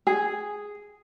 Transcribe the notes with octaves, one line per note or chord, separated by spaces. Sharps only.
G#4